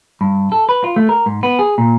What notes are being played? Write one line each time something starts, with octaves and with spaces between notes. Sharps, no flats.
G2
A4
B4
F4
A3
A#4
G#2
B3
G#4
A#2